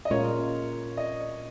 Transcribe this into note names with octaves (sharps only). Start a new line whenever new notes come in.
D#5
A#2 G#3 C#4 F4 A#4 C#5
D#5